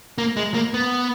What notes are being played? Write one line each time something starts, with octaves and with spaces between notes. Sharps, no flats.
A#3
G#3
A#3
B3